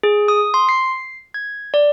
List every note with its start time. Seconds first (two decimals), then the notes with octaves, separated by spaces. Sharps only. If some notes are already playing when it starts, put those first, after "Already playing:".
0.03 G#4
0.28 D#6
0.54 C6
0.69 C7
1.34 G#6
1.74 D5